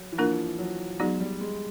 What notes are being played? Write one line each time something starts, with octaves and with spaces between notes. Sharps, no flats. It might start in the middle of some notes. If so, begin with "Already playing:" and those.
Already playing: F#3
E3
F3 A#3 D4 F4 A#4
F#3
F#3 G#3 B3 D#4 F#4
G3
G#3